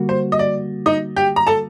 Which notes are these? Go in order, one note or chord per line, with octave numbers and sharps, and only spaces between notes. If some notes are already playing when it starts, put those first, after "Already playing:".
Already playing: D3 G3 A#3 F#4
C5
D#5
D5
D#4 D#5
G4 G5
A#5
A4 A5